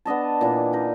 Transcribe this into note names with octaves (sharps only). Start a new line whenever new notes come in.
B3 D4 D#5 A5
A#2 E3 D4
D#4 A#4